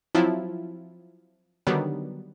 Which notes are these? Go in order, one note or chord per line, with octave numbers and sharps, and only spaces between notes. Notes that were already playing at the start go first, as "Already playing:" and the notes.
F3 F#3 C4 E4 F4
D3 D#3 F#3 G3 B3